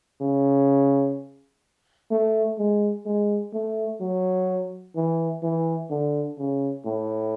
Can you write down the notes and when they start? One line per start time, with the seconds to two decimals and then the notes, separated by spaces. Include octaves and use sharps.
0.21 C#3
2.11 A3
2.58 G#3
3.06 G#3
3.53 A3
4.01 F#3
4.96 E3
5.43 E3
5.90 D3
6.38 C#3
6.85 A2